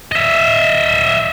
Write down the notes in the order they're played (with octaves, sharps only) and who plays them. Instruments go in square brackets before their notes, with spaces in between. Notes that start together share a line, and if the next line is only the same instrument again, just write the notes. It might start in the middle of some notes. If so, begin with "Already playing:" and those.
[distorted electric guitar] D#5 E5